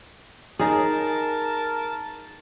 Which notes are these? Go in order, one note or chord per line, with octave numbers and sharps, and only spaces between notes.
D#4 G#4 A#4 A5